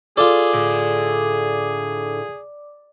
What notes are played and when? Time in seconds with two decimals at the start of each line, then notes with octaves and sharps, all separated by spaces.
0.17 F4 G#4 A4 D5
0.53 A2 D3